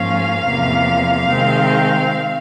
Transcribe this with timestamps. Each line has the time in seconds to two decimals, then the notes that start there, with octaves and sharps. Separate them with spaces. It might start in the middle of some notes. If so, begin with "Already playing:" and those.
Already playing: G#2 F3 A#3 C#4 F5
0.46 E2 C3 F3 A#3
1.28 C3 D#3 G#3 C4